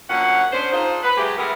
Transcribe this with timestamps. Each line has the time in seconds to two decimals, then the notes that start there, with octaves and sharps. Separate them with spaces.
0.09 D2 A#2 F#3 C#4 F#5
0.52 B3 C#4 D4 C5
0.72 D4 D#4 F4 G#4 C5
1.03 B4
1.17 F#3 G#3 A3 G4
1.38 D3 G3 A3 B3 G#4 A#4